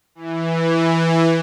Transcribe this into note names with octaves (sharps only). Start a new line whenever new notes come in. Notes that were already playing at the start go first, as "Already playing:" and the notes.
E3